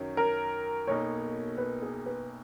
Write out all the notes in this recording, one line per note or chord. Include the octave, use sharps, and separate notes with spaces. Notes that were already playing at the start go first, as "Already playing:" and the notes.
Already playing: F#2 D#3 F#3 C#4
A#4
B1 B2 A#3 D#4 C#5
B4
G#4
B4